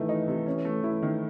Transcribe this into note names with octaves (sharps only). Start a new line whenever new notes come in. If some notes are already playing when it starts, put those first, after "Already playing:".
Already playing: D#3 E3 A3
D#4
C3
C#4
A3
E3 E4
D#3